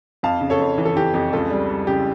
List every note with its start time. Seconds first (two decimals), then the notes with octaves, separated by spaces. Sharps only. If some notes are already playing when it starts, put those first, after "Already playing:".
0.23 F2 F5 A5
0.41 C#3
0.50 A4 C#5
0.59 F2
0.78 E3
0.85 A4
0.96 E3 G4
1.14 F2 G4
1.32 C#2 F4 A4
1.50 G3
1.70 G3
1.87 C#3 G4